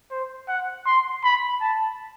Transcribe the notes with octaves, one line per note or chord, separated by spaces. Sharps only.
C5
F#5
C6
B5
A5